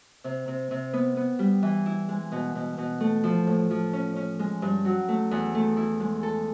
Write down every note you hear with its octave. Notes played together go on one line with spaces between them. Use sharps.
C3
C3
C3
B3
B3
G3
E3
E4
G#3
B2
B2
B2
A3
F3
A2
F3
C#4
C#4
G#3
G2
F#3
A3
E2
A3
E4
G#3
A4